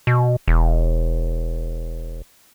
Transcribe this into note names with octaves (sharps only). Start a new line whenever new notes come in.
B2
E1